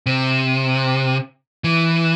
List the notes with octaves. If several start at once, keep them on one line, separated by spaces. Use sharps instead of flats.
C3
E3